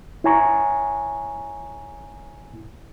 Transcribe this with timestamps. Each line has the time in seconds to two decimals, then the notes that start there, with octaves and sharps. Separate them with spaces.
0.24 E4 C#5 G#5 A#5 C#6